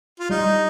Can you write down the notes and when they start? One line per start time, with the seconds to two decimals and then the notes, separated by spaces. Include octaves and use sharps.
0.19 F4
0.30 G3 D#4